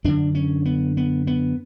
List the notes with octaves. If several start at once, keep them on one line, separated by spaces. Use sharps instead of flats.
F#2 D3 D4
C#4
B3
B3
B3